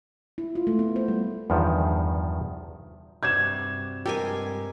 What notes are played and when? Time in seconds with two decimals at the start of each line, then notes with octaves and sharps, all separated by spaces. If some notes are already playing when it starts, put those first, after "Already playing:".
0.38 E4
0.55 F4
0.67 A3
0.79 B3
0.96 C5
1.08 G3
1.50 E2 G2 D#3 F3
3.23 G2 C3 D4 F#4 G#6 E7
4.06 G2 G3 G#3 G4 A4 A#4 G#5